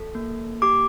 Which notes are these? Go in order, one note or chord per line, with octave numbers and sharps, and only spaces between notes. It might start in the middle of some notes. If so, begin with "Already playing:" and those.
Already playing: A4
A#3
G4 D6